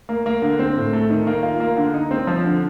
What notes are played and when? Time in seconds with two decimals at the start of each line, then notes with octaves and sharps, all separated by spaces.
0.09 A#3
0.26 A#3
0.42 D3
0.59 C4
0.76 A2
0.93 A3
1.10 D#3
1.27 A#3
1.43 F4
1.60 A#3
1.77 D3
1.94 D#4
2.11 C4
2.27 F3
2.44 D3